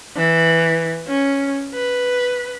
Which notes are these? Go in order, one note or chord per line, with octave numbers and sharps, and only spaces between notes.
E3
C#4
B4